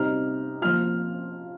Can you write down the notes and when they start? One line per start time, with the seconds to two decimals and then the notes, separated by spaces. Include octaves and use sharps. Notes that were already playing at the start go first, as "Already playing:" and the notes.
Already playing: C3 G3 C4 D#4 F6
0.61 F3 A#3 F4 F6